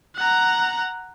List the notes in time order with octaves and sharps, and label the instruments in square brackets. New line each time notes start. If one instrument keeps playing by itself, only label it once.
[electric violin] F#5 A#5